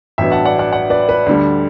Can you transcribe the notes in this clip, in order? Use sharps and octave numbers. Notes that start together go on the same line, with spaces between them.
A1 G2 F#3 B3 E5 G5
F#5 A5
D5 F#5
D5 F#5
D5 F#5
B4 D5
B4
D2 D3 G3